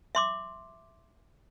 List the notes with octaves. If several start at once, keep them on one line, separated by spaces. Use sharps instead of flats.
E5 C6 D6